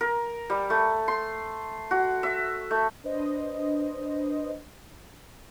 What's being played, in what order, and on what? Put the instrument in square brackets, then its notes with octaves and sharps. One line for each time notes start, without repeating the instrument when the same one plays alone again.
[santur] A#4
G3
A3
C6
F#4
E5
A3
[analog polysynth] D4 B4 C5 D#5